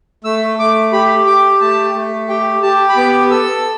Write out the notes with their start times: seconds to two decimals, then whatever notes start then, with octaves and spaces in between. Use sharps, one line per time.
0.24 A3 E6
0.59 A3 D6
0.92 G4 B5
1.26 G4 D6
1.61 A3 A5
1.95 A3
2.29 G4 G5
2.63 G4 A5
2.89 B5
2.97 B3 D6
3.31 A4 E6